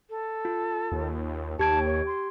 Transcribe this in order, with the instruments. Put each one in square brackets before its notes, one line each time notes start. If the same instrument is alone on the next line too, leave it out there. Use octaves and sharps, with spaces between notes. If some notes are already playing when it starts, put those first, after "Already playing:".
[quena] A4
[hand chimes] F4
[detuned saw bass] D#2
[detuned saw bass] D#2 [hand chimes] G4 G#6 D7 [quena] A5
[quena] C#5
C6